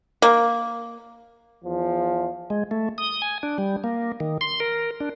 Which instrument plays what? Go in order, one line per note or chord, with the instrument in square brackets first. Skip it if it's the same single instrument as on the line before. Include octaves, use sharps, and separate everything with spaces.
[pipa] A#3
[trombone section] E2 F3
[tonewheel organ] G#3
A3
D#6
G#5
D4
G3
A#3
D#3
C6
A#4
D4